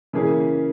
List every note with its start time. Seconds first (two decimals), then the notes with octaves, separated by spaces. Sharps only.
0.13 C#3 E3 A#3 C#4 G#4